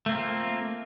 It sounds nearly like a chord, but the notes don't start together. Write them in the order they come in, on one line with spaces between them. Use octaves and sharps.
A3 A#3 C4 F4